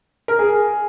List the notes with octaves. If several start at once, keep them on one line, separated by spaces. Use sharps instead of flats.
A#4
G#4